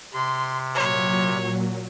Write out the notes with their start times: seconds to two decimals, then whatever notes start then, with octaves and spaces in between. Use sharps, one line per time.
0.13 C3 C6
0.75 A#2 F#3 C#5